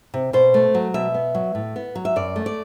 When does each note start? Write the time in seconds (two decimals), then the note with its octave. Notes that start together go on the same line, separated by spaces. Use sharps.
0.14 C3
0.33 B2 C5
0.54 A3
0.75 F#3
0.94 B2 E5
1.14 B3
1.35 F#3
1.55 A2
1.76 B3
1.95 F#3
2.05 E5
2.16 F#2 D5
2.36 A3
2.46 D5